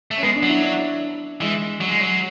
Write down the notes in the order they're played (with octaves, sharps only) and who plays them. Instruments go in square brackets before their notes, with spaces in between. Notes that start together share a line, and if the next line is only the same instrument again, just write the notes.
[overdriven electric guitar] A3
[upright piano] C#4
[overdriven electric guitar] G#3 [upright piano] B3
[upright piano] D4
[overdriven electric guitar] F#3
[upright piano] E4
D4
[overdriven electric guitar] E3 [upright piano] G#3
[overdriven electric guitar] F#3
G#3
F#3